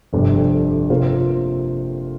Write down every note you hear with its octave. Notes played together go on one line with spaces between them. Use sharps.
G1 F2 C3 G3 D4
C3 A#3 F4 C5